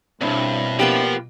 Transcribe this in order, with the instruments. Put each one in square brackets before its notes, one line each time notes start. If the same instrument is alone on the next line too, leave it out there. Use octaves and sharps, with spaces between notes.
[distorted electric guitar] D2 G2 [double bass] B2 [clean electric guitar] C4 D4 E4
[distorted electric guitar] F3 [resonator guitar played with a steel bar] A#3 B3 G4